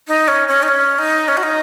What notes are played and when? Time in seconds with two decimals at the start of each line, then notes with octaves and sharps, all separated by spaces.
0.08 D#4
0.28 C#4
0.48 C#4
0.63 D#4
0.68 C#4
0.99 D#4
1.28 C#4
1.37 F#4
1.43 D#4